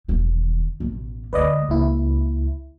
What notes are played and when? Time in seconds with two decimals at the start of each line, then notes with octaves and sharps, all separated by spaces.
0.08 E1 D#3
0.80 A1 B2
1.33 D2 G#3 B4 D5 D#5
1.69 C#2 A#3 E4